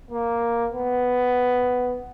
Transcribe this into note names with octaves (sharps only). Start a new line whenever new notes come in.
A#3
B3